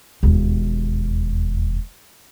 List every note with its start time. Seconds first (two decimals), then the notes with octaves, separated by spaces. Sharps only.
0.23 E1 D#2